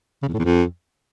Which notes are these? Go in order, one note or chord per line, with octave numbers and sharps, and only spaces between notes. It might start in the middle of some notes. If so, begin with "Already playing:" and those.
C#3
E2
A2
E2
F2